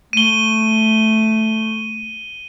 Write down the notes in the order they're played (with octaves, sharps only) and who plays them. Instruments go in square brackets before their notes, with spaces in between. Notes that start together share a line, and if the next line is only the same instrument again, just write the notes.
[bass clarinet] A3 [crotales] D#7 G7